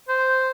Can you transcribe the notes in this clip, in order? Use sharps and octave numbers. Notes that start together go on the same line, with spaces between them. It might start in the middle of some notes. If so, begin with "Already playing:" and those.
C5